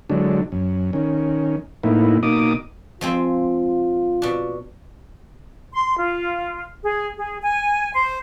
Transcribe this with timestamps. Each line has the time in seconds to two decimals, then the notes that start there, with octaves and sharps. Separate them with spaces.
0.10 D3 F#3 G#3 D4
0.52 F#2
0.93 D#3 C#4
1.83 A2 A#3 B3 D#4 E4
2.23 B2 A#3 D#4 D6 D#6
3.01 F3 G#3 C4 F4
4.22 B2 D4
5.73 C6
5.97 F4
6.83 G#4
7.17 G#4
7.42 G#5
7.93 C5